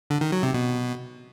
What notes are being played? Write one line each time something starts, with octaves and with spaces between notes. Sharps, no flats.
D3
D#3
F#3
C3
B2